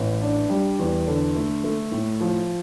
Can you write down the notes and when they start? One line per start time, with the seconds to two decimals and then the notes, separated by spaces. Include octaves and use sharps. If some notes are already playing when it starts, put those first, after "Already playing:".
Already playing: A1
0.21 D4
0.50 G3
0.79 E2
1.07 D3
1.35 A3
1.64 A3
1.91 A2
2.21 F3